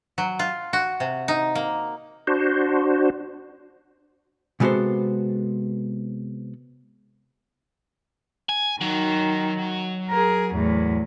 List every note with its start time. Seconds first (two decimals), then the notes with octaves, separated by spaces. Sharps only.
0.18 F#3
0.39 F4
0.73 F#4
1.00 C3
1.28 D#4
1.55 A#3
2.27 D4 F#4 C5
4.60 C3 G#3 B3 F#4 A4 C5
8.49 G#5
8.81 D#3 F#3
10.10 G#4 A#4
10.54 E2 A2